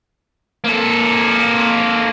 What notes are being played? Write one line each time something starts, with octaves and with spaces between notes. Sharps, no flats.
A#3 A4